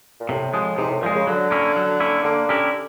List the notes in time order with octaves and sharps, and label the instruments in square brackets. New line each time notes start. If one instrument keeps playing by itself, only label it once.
[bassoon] A#2
[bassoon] A2 [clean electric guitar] C3
[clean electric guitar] F3 G#3
[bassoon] G#2 [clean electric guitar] C3
[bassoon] A2
[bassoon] A#2 [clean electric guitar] F3 G#3
[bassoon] C#3
[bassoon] D3 [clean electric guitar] F#3
[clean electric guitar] A#3 C#4 E4
F#3
A#3 C#4 E4
[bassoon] D3 [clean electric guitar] A#3
[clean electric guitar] C#4 E4 G4 A#4